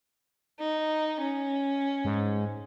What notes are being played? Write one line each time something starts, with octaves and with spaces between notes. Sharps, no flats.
D#4
C#4
G#2